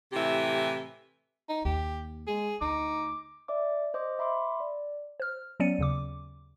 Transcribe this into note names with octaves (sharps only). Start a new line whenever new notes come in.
A2 C3 E3 G4 E5
D#4
D#2 G4
G#3 G#4
D2 D#4 D6
D5 E5 D6
C5 D#5 D6
E5 B5 C6 D6
D5
C5 F6
F#3 B3 C#4 D5 C#7 D#7
D#2 C#3 D6